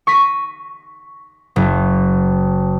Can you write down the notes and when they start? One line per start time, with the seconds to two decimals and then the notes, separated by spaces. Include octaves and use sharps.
0.07 C#6 A#6 B6 D#7
1.56 F#1